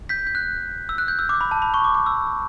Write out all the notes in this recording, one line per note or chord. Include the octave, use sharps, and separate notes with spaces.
G6 B6
G6
F#6
E6
F#6
G6
E6
D6
B5
A5
B5
C#6
D6
D6
E6